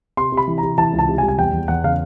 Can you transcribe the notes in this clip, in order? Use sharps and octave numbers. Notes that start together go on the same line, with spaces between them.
C3 C6
C3
B5
E3
A#5
C3
E3 A5
C#2
A5
C3
G#5
G3
G#5
E2 G5
E2
E2 F#5
C#3 F5